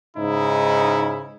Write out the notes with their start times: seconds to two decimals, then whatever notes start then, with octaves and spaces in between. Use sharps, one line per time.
0.16 G#2 C#3 D#4 E4